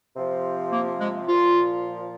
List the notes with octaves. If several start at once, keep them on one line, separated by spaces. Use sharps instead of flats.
C3 F3
A#3
G#3
A#2 F3 F4